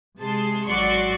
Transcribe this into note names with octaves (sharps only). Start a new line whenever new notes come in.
C3 G#3 G#4 A5 C6
G#1 F#3 F#4 D5 C6 C#6